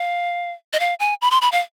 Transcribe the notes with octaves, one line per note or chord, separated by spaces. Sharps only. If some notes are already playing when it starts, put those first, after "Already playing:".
Already playing: F5
D#5
F5
G#5
B5
C6
B5
F5